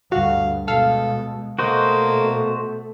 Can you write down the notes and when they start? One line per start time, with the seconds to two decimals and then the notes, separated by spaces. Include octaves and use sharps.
0.12 D2 G2 F#4 F5
0.68 B2 G#3 A4 F5
1.59 B2 A3 A#3 F#4 C5 D#5